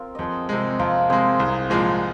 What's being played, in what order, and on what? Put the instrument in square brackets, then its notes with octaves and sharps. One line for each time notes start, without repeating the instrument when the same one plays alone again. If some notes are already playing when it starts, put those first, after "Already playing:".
Already playing: [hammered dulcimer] C4 F4 A#4
[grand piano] F2 [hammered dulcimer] G#4 C5 D#5
[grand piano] C3 G#3
[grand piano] F2 [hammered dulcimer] F4 A#4
[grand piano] C3 G#3 [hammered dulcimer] G#4 C5
[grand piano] C2
A#2 F3 G#3